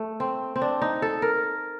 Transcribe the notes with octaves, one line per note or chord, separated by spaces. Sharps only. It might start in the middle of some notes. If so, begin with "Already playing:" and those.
Already playing: A3
C4
C4
D4
D#4
A4
A#4